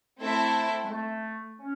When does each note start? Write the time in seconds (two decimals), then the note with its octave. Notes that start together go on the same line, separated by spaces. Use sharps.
0.20 A3 C4 E4 A4 C5 E5
0.85 G#3
0.90 A3
1.60 C#4